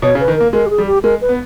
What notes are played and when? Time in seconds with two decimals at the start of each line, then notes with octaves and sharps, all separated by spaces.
0.02 B2 C#5
0.15 C#3
0.20 B4
0.28 D#3
0.36 A#3 A#4
0.53 G#3 A#4
0.66 G4
0.70 G#4
0.78 G3
0.87 G4
1.03 G#3 A#4
1.21 B4
1.29 B3